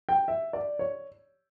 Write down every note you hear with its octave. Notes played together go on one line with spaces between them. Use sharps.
G5
E5
D5
C#5